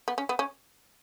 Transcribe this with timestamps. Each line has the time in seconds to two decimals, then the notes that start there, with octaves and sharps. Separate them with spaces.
0.08 B3
0.18 C#4
0.29 B3
0.39 C#4